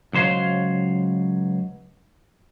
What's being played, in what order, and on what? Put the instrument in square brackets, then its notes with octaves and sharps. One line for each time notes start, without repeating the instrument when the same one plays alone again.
[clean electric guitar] C#2 F#3 C5 C#5 F5